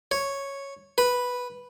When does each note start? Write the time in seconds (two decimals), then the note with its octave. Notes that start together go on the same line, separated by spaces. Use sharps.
0.11 C#5
0.98 B4